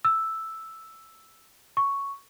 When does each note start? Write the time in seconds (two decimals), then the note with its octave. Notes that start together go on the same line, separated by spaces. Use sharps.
0.05 E6
1.77 C#6